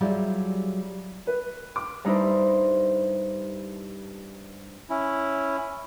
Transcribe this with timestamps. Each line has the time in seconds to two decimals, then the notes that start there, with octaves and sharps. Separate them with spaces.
0.01 F#3 G3 E4 F4 G4 G#4
1.27 B4
1.76 D6
2.04 G2 D#4 E4 C5
4.90 C#4 E4